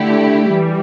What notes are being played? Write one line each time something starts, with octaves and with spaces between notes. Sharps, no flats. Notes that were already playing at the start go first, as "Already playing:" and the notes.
Already playing: D3 A3 E4 G4
E3 G3